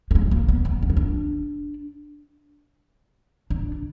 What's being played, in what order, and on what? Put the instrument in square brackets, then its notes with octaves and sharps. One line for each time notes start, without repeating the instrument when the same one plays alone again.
[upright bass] A#3
G#3
G#3
A#3
B3
B3
D4
B3
D4
D4